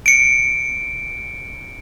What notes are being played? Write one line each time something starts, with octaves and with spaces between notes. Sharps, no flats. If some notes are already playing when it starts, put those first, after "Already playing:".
C#7 D7